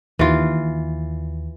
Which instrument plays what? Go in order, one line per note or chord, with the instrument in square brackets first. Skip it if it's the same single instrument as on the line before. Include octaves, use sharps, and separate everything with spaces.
[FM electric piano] D#2 [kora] E3 F4